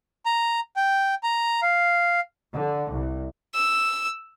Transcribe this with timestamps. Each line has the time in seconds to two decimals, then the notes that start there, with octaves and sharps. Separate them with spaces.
0.26 A#5
0.76 G5
1.23 A#5
1.62 F5
2.54 D3
2.92 C2
3.54 E6